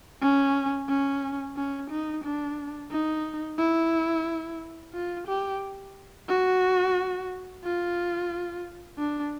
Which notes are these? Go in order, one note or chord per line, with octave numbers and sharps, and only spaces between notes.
C#4
C#4
C#4
D#4
D4
D#4
E4
F4
G4
F#4
F4
D4